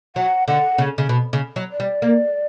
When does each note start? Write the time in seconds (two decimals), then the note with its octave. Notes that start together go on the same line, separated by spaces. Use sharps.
0.16 F#3 F#5
0.48 D3 F#5
0.78 C#3
0.98 C#3
1.09 B2
1.33 C#3
1.56 F#3
1.72 D5
1.80 G3
2.02 A#3